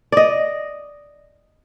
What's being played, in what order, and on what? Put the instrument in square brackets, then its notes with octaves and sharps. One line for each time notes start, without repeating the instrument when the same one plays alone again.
[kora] D5 D#5